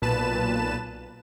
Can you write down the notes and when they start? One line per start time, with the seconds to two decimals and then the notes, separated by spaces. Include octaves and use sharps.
0.02 B1 A#2 B4 A5 E7